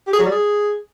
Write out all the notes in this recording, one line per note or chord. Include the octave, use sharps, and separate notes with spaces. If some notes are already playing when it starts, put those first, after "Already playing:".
G4
G#4
F#3
G3
G#4